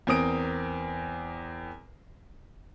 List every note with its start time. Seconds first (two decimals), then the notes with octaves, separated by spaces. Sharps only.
0.07 E2 C4 A#4 D#6 D7